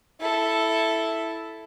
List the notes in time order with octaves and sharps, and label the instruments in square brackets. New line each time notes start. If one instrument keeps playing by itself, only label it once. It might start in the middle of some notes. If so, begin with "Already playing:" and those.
[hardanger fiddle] E4 A4